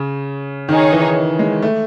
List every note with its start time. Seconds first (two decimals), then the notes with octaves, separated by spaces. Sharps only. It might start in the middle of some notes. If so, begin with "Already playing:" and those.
Already playing: C#3
0.69 D#3 D#4 G#4 C#5
0.93 E3
1.39 G#3
1.62 A3